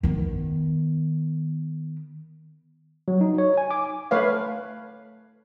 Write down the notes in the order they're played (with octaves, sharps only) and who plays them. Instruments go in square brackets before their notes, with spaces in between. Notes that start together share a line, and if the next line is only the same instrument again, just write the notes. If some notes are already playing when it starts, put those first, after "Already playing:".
[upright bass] D#3 B3
[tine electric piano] F#3
D#4
C#5
G#5
D6
[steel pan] A3 B4 C#5 F5